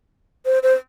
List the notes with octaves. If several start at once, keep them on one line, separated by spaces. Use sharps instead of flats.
C5
C5